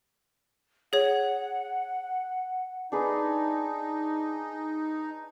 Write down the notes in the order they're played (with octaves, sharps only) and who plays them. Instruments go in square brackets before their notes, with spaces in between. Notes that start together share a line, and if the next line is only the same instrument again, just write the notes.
[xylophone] G#4 C#5 [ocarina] F#5
[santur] D4 G#4 B4 [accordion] D#4